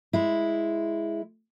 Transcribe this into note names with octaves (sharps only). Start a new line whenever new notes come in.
G#3 E4